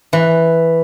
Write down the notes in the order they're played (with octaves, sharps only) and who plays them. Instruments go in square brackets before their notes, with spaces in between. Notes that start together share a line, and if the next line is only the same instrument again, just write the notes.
[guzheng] E3